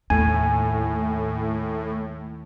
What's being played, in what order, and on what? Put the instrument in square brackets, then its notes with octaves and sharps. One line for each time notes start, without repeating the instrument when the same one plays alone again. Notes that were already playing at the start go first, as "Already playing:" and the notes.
[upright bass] D#2 [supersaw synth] A2 [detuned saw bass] A3 [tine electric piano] G#5